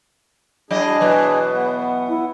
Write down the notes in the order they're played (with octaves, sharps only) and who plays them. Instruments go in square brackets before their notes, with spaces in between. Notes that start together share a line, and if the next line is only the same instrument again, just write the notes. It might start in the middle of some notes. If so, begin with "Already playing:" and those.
[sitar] F#3 E4 D#5 [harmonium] G#3 D4 G#4
[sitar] B2 E3 F#3 [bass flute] B4
[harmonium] B3
[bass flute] E4